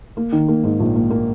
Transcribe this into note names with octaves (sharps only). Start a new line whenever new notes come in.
A#3
D#3
A#3
G#2
A#1
A#3
A#3